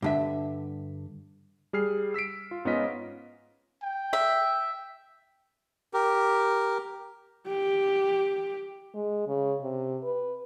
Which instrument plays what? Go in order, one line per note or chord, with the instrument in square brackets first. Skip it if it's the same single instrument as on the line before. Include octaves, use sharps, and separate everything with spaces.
[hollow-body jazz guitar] G2 D3 E5
[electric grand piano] G3 G#4 F6 C7
E6 B6 C7 D7
F4
G#2 B3 C#4 F4 D#5 B6
[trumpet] G5
[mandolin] E5
[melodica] G4 A#4
[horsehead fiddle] G4
[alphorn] G#3
C#3
C3
B4